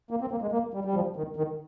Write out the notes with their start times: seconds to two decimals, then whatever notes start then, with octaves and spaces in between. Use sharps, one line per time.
0.11 A#3
0.21 C4
0.31 A#3
0.42 G#3
0.52 A#3
0.74 G3
0.85 G3
0.94 F3
1.16 D#3
1.36 D#3